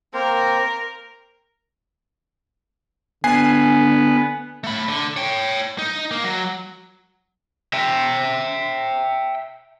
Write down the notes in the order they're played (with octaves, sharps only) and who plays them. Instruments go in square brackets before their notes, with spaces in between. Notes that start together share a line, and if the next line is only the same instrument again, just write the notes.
[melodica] A#3 C4 C5 [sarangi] A#4
[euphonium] D3 [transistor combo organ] B3 [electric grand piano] G#5 C7
[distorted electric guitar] A3 B5
D3
C#5 G5
D#4
A#3
F#3
[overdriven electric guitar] E5 G5